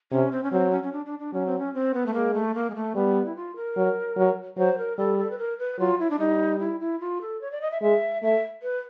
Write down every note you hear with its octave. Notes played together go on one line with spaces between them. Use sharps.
C3 C#4
C4
C#4
F#3 C4
C#4
C#4
D4
D4
D4
F#3 C#4
C4
C#4
C4
B3
A3
G#3 A#3
A3
A#3
G#3
A3
G3 B3
E4
F4
A#4
F#3
F#3
F#3 C5
A#4
G3 A4
A4
B4
A#4
B4
F#3 F4
E4
D4
G3 D#4
E4
E4
F4
A4
C#5
D5
D#5
E5
G#3 E5
A3 E5
B4